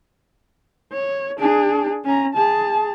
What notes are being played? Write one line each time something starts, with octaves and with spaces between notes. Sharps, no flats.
C#5
D4 G#4
C#4 A#5
G#4 A5